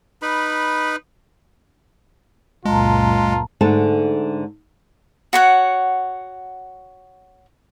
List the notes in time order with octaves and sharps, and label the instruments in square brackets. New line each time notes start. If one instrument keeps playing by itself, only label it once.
[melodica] D#4 B4 B5
[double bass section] C#2 F#2 A#2 [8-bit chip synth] G#3 [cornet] F4 [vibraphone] A5 A#5
[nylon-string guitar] G#2 D3 A3 A5
[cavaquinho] F#4 C#5 F#5